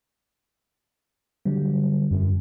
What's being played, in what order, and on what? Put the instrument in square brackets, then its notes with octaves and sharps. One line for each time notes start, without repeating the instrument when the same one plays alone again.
[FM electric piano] D3 F#3 G3
[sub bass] F#2